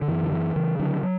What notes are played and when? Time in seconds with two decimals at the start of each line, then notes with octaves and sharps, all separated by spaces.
0.02 D3
0.08 F#2 E3
0.23 D3
0.32 E3
0.56 C#3 E3
0.79 D3 F#3
1.03 F#3